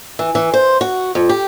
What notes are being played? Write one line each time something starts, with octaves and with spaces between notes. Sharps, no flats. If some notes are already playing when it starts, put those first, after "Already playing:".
E3
E3
C5
F#4
F2
G4